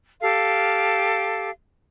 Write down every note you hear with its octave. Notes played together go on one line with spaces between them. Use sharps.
G4 A4 F5